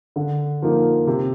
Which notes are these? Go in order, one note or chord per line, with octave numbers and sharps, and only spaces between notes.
D3
F3 A#3 D#4
C3